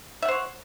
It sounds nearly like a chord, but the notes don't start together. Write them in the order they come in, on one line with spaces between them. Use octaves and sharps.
E5 F#5 C5 C#5